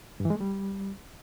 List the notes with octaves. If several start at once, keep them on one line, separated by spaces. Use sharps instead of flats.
G2
E3
G#3
A3
G3